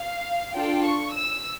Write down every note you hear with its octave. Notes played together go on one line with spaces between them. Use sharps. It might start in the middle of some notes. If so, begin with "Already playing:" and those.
Already playing: F5
D4 F4 A4 G5
C#6
E6